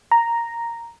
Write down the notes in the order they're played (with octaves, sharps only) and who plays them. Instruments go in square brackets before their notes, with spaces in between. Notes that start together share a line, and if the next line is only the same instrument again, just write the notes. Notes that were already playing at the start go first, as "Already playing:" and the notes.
[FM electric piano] A#5